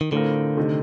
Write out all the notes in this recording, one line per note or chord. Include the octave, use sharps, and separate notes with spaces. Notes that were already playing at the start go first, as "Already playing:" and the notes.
D#3
A2 D3 A3 C4 F4 A#4
C3 D#3 A3